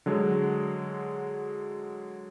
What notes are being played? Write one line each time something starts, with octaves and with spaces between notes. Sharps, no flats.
D3 F#3 G#3